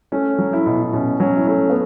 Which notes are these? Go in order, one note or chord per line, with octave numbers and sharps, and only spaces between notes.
A3 C#4
F#3
E4
B2
E4
B2 C#4
F#3 C#4
E4
A3 C#4
B3